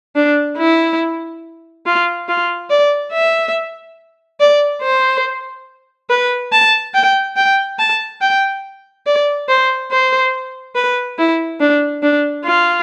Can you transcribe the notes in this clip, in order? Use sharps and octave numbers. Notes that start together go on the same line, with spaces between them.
D4
E4
F4
F4
D5
E5
D5
C5
B4
A5
G5
G5
A5
G5
D5
C5
C5
B4
E4
D4
D4
F4